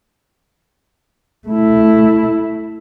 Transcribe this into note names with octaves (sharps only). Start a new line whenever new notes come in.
A3 E4